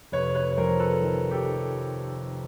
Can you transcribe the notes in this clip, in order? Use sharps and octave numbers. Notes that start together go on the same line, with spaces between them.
F1 B4 C#5
B4 C#5
C#5
F2 A#4 C5
A4 B4
D#3
G4 A4